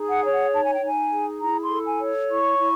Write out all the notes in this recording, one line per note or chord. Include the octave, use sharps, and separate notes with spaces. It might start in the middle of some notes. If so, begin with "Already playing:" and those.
Already playing: D#4 G#4
F#5
C#5
F#5
D#4 A5
G#5
G5
D#4 G#5
G#4
E4 A#5
C6
A4
G#5
C#5
E4 C#6
E4